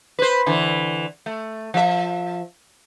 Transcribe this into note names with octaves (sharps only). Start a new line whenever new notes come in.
B4 C5
D3 E3
A3
F3 E5